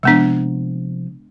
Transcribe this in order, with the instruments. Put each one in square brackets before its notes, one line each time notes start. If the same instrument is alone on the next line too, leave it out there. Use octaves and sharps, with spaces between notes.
[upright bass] C3 F3 [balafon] G#3 B3 D4